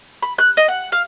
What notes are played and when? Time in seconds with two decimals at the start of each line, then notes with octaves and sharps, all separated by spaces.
0.22 B5
0.38 F#6
0.57 D#5
0.68 F#5
0.92 F5